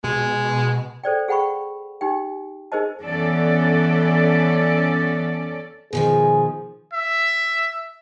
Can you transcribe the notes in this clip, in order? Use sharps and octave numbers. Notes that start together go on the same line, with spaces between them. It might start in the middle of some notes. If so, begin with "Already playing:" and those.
B2 G#3
A4 C5 D5 G5
G#4 F#5 G5 B5 C#6
D#4 G4 G5
D#4 G#4 A#4 C5 D#5 A5
E3 B3 C#4 A4 D5
B2 D#3 F3 G#4
E5